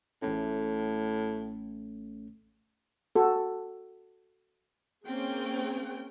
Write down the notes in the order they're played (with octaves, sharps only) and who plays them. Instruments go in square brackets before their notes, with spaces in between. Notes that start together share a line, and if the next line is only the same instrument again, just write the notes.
[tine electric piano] A1 A3 C#4 [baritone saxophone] A2
[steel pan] F#4 A4
[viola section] A#3 C4 C#4 G#4 G5